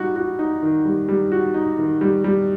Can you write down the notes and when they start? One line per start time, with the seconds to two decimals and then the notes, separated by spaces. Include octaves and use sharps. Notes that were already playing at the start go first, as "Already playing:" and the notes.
Already playing: G3 D#4 F#4
0.16 F#4
0.39 D#4
0.62 D#3
0.85 G3
1.08 G3
1.32 F#4
1.54 D#4
1.78 D#3
2.01 G3
2.24 G3